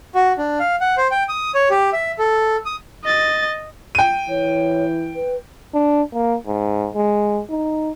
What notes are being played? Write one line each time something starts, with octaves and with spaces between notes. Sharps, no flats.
F#4
D4
F5
F#5
C5
G5
D#6
C#5
G4
E5
A4
D#6
D#5 A6
G5 D#7
E3 C#5
B4
D4
A#3
G#2
G#3
D#4